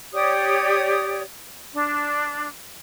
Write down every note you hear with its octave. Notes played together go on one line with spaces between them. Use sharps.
G4 C#5 D5 D#6
D4